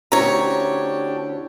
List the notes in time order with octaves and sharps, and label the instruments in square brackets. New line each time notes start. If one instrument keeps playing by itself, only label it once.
[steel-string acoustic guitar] D2 C#5 [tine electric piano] C#4 E4 C5 [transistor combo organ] D4 G4 [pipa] A#5